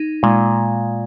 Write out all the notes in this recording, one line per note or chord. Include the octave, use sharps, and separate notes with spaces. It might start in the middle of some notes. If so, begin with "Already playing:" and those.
Already playing: D#4
A#2 G#3